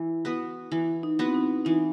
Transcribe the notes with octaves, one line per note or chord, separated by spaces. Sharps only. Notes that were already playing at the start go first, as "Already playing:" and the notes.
Already playing: E3 E4
B3 F#4 B4
E3 E4
D#4
B3 F#4 B4
C4
D#4
E3 D#4